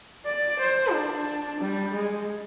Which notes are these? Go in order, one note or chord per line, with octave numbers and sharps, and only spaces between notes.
D5
C5
D4
G3
G#3